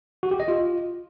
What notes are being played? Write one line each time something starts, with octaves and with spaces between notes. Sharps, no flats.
F#4
G4
D#5
F4